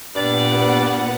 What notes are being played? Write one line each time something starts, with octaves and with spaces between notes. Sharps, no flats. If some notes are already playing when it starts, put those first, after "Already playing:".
G2 A#2 B3 D5 F#5